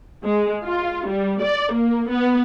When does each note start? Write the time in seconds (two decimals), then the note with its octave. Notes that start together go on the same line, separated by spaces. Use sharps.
0.24 G#3
0.64 F4
1.08 G3
1.43 D5
1.74 A#3
2.10 B3